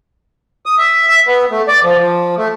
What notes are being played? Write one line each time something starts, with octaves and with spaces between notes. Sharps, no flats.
D#6
E5
E5
B3
A3
D5
F3
F3
A3